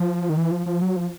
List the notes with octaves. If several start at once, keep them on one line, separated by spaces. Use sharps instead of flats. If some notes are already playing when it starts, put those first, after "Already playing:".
Already playing: F3
D#3
E3
F3
F3
F#3
F3